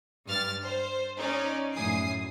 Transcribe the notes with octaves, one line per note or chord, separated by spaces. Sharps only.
G2 F6 A6
C5
C#4 D#4 D5
F#2 A2 G#5 D#6 C7